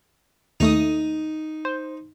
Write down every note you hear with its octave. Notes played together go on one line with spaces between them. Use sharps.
D#2 A3 D#4 D#6
C5